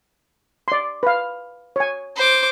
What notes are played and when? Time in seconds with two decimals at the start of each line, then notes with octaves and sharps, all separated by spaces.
0.68 D5 C6
1.03 B4 F5
1.76 C#5 G#5
2.16 C5 D6